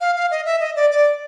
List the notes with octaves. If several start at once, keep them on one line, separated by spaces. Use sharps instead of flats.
F5
F5
D#5
E5
D#5
D5
D5